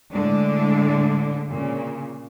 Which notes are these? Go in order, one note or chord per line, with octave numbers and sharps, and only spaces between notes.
A2 D3 G#3 D4
A#2 C#3